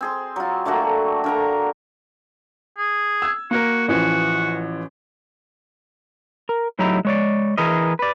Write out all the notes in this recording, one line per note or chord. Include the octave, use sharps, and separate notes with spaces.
C4 G#4 C6
F#3 F4
D3 A3 A#3 F#4
D3 A#4 A#5
G#4
E6 G#6
A#3 F#4 A#4
A1 E3 F3 F#4
A#4
A2 F#3 D#4 E4 G4 A#5
G#3 C#5 D5
E3 G#4 A#4 B4 D#5
B4 D5